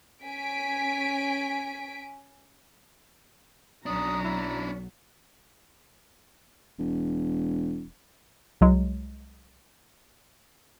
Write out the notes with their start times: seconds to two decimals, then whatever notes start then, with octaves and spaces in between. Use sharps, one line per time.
0.24 C#4 G#5 B6 D7
3.86 B1 F#3 C#4 D4 A#5 D#6
4.23 E4
6.79 E1
8.61 C2 F#3 G#3